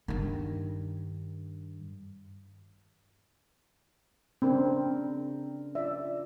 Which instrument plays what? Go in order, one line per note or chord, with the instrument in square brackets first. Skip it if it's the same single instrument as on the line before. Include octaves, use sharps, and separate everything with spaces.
[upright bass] G2 D#3
[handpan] C#3 D4 A#4 [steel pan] C4
[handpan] F4 D5 [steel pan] E5